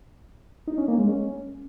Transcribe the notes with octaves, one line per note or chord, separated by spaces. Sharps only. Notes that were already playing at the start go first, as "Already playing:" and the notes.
D#4
C#4
A#3
G#3
C#4